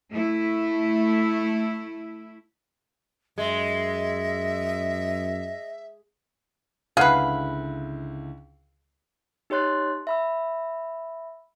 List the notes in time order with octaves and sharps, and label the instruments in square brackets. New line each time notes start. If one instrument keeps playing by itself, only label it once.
[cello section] A3 E4
[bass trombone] F#2 [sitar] G#3 [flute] D#5 [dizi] E5
[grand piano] C#2 D3 E4 [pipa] G#4 B4 [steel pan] F5 F#5
[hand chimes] D#4 G4 C#5 C6 F#6 A6
E5 B5 E6